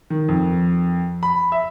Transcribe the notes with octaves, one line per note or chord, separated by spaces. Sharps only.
D#3
F2
B5
E5